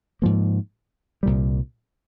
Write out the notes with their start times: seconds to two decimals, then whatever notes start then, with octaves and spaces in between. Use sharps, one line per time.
0.22 G#2 F3 A#3
1.23 C2 A#2 G3